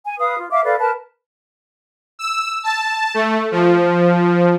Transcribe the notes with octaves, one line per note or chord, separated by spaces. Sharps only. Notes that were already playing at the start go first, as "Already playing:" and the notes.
G#5
B4 F5 D#6
F4
E5 F5 D6
A4 B4 D5 F5
A#4 B4 A5
E6
A5
A3
F3